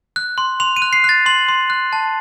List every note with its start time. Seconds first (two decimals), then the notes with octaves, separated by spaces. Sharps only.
0.16 F#6
0.38 C6
0.60 C6 F7
0.76 D#7
0.82 F#6
0.93 C7
1.04 F#6 A6
1.26 C6 F#7
1.49 C6
1.70 F#6
1.93 A5